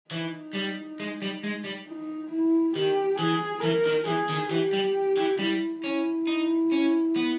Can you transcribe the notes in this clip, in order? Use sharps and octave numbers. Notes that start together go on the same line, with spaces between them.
E3 D#4
G3
G#3
G3
G#3
G3
D#4
E4
D#3 G4
E3 G#4
E3 A#4
D#3
E3 G#4
D#3
E3 G4
G3
E3
G3 E4
C#4 E4
D#4
C#4
B3